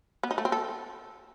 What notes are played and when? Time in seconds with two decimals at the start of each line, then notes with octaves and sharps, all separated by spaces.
0.23 B3
0.31 D#4
0.38 A3
0.45 C4
0.52 A4